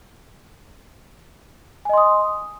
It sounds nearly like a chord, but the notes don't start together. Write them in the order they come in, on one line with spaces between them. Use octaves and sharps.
G#5 D#5 C6 D#6